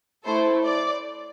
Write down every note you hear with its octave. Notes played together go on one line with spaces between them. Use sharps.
A3 E4 A4 C5
D5